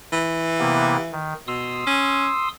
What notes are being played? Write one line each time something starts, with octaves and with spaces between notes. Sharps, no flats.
E3
C3 A#3 B3
D#3
B2 C6 D#6 E6
C#4